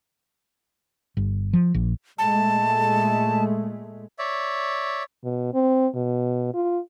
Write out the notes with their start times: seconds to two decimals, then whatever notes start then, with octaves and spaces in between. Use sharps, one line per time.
1.17 G1
1.53 F3
1.74 A#1
2.19 A#2 G#3 A3 A5
4.18 C#5 D5 E5
5.24 B2
5.54 C4
5.95 B2
6.54 F4